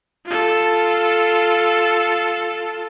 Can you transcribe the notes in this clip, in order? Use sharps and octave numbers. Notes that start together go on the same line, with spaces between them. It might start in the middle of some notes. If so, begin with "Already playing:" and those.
F4 A4